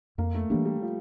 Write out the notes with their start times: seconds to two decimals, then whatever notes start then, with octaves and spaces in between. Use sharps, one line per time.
0.18 F2 A#3
0.35 A3
0.50 E3 G3 A#3 D4
0.66 G3
0.82 F3